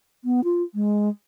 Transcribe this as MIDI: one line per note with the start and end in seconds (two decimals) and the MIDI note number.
0.24 0.44 59
0.44 0.63 65
0.74 1.09 56